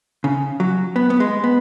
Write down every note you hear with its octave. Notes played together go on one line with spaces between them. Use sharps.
C#3
F#3
B3
B3
G#3
B3